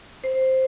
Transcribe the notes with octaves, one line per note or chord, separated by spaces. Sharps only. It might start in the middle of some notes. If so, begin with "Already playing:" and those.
C5